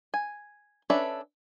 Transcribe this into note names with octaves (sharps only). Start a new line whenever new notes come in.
G#5
C#4 D4 A4 B4 E5